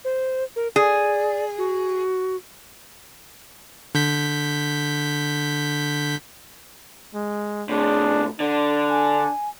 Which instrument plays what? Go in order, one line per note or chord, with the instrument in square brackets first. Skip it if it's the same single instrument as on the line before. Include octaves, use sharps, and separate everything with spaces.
[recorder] C5
A#4
[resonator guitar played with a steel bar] G#4 [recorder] D5
[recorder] F#4
[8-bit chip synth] D3 G6 B6
[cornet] G#3
[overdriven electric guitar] A2 C3 [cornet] D4 [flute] G#4
[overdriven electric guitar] D3 [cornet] D4 [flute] D5
[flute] G#5